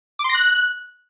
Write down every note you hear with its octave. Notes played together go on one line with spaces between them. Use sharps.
D6
C6
A#6
F#6